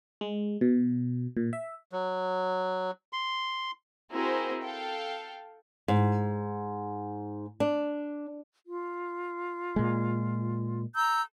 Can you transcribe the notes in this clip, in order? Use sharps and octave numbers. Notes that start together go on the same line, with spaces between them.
G#3
B2
A#2
E5
F#3
C6
C4 E4 F#4 G#4 A#4 C5
A4 F5 G5
G#2
D4
F4
A#2 G#3
A#5 E6 G6